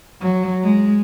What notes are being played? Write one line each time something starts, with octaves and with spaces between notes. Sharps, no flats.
F#3
G#3